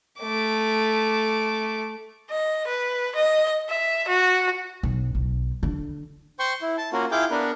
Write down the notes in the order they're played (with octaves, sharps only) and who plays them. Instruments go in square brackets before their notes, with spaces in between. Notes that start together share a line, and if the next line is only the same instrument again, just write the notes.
[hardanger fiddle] A3 D6
[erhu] D#5
B4
D#5
E5
F#4
[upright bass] B1
B1
D3
[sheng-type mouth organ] C5 G5 C6 C#6
E4
A5
A#3 C#4 F4 F#4 A#4
E4 F4 G#4 F5 G5 D6
B3 D4 A#4 B4